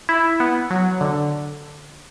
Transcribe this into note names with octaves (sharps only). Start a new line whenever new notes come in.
E4
B3
F#3
D3